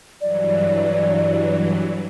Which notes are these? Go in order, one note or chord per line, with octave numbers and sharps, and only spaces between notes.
G2 E3 F#3 D5